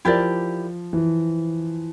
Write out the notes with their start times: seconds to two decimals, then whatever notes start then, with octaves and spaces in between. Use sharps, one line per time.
0.05 F3 E4 G4 A#4 D5
0.93 E3